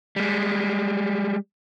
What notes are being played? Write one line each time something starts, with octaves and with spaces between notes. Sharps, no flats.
G3 G#3